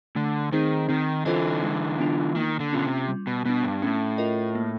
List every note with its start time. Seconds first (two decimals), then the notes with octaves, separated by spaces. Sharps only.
0.15 D3 A3
0.52 D#3 C4 D#4 G#4 C5
0.89 D#3 C4
1.25 D3 E3 F4 A4 C5 D#5
1.63 G#3
1.99 B3 D4 F4
2.36 D#3 A#3
2.60 D3
2.73 B2 C#4 F4
2.84 C3
3.08 G3
3.27 B2
3.45 B2 B3 D4
3.64 G2
3.82 A2 C#4
4.18 F4 A#4 D#5
4.55 A#3